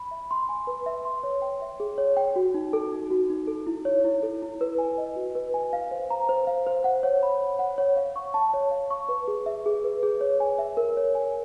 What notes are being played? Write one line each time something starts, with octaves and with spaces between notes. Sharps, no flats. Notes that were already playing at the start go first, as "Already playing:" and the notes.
Already playing: B5
E5
C6
G#5
B4
E5
C6
C#5
G5
E5
G#4
C#5
G5
F#4
D#4
A4
D#4
F#4
D#4
A4
E4
C#5
E4
A4
E4
B4
G#5
D#5
F#4
B4
G#5
F5
C5
A#5
C5
F5
C5
F#5
C#5
B5
C#5
F#5
C#5
F5
C#6
A5
C#5
F5
C#6
B4
G#4
E5
G#4
B4
G#4
C#5
G#5
E5
A#4
C#5
G#5